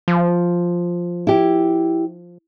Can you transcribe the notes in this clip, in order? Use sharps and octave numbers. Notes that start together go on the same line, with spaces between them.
F3
E4 G4